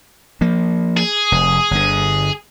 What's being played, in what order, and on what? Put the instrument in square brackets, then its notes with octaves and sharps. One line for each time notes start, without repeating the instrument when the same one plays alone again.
[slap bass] F3 A#3
[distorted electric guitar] G#4
[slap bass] F1
G1 D3